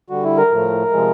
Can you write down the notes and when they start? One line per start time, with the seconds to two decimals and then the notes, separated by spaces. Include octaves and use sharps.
0.10 D3 G3 F#4
0.24 E4
0.37 A#4
0.51 A2 F3 A3
0.91 C3 F3 G#3